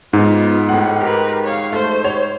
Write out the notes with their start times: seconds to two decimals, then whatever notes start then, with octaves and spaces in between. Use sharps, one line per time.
0.13 G#2 B3 D#4 F4
0.69 A2 F#5
1.01 G4 A#4 B4
1.44 C#5 F5
1.73 A3 C5
2.04 C#5